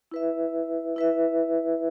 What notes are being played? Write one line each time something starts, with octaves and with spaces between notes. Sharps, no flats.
E4 B4 E5
E4 B4 E5